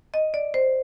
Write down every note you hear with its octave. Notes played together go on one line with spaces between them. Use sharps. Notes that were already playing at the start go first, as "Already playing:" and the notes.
D#5
D5
C5